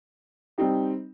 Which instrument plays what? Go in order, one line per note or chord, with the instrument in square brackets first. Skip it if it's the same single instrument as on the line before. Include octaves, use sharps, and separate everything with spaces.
[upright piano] G3 C4 D#4 G4